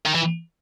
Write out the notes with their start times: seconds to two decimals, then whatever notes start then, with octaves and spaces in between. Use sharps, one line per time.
0.06 D#3
0.15 E3